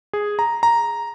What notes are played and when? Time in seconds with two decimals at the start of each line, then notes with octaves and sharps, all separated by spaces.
0.13 G#4
0.39 A#5
0.63 A#5